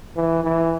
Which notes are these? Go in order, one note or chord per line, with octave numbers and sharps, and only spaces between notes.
E3
E3